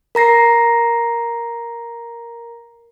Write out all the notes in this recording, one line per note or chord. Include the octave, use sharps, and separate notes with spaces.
A#4 A#5 A#6 C7